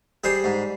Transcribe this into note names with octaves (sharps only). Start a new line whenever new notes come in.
G3 G#4 C5
G#2